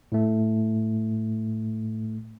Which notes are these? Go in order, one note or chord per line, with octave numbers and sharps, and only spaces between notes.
A2 A3